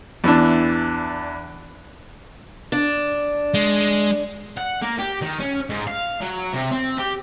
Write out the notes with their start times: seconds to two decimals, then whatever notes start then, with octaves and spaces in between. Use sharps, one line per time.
0.24 E2 E3 D4
2.72 D4
3.54 G#3
4.57 F#5
4.82 A#3
4.99 G4
5.21 D#3
5.40 C#4
5.69 G#2
5.88 F5
6.21 F#3
6.53 C3
6.71 C4
6.98 G4